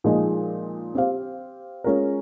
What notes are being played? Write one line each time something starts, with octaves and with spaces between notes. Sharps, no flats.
A#2 F3 G#3 D#4
C4 G4 C5 F5
G#3 C#4 F4 A#4